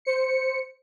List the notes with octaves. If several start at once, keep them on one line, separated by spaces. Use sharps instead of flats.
C5 C#7